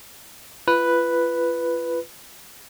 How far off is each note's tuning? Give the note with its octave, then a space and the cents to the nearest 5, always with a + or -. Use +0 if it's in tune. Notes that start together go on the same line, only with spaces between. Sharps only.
F4 -35 B4 +0